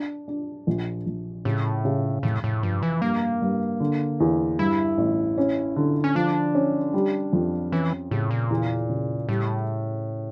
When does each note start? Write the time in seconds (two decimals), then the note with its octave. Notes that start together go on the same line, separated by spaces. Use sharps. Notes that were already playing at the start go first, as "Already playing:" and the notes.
Already playing: D4
0.28 D4
0.67 A#1
1.06 A#1
1.45 A2 C#3
1.85 C#3
2.23 F1 A2
2.44 A2
2.62 G2 F3
2.83 E3
3.02 G2 A#3
3.42 G2
3.80 D3
4.20 E2
4.59 G2 E4
4.98 A1
5.38 C#4
5.76 D3
6.04 C#4
6.15 F3 D4
6.55 C#4
6.94 G3
7.33 F2
7.72 E3 C#4
8.11 A2 C#3
8.31 A#2
8.50 E2
8.90 C#3
9.29 A2 G3